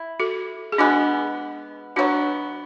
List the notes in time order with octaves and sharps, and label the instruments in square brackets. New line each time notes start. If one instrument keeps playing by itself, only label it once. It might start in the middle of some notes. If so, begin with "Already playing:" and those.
Already playing: [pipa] E4
[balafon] F#4 A4
G#4
[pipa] B2 G#3 B3 [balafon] D4 F#4
[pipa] B2 F#3 B3 [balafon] D4 F#4